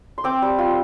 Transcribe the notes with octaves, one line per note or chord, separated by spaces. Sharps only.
C6
C4 D6
G3
F4